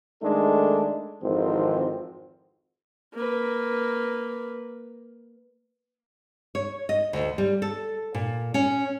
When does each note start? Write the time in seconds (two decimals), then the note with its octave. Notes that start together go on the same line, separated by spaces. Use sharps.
0.22 D#3 G#3 A3 D4 D#4 A4
1.22 G#1 F2 G#2 D#3 E3 C4
3.14 A#3 B4
6.55 C#5
6.89 D#5
7.13 D2
7.38 G3
7.62 A4
8.14 A#2
8.54 C#4